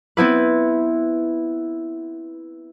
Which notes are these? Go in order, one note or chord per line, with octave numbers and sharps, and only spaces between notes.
B3 C4 E4 B4